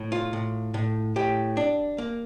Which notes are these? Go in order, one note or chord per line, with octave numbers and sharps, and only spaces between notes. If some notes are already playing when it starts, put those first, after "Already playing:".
Already playing: A2
F4
A2
A2
A2 G4
D4
A#3